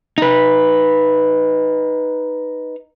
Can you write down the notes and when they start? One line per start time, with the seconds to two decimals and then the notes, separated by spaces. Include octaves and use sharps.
0.18 D#4 B4